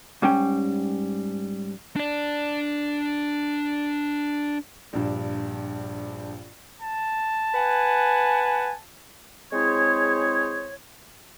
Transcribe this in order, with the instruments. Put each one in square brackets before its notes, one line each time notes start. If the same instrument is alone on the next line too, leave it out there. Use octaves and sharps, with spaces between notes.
[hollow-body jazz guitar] G#2 G3 C#4 G5
[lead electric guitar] D4 D5
[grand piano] A#1 G2
[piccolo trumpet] A5
[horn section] B4 F#5 G#5
[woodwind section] G#3 C4 E4 G#4 C5 C#5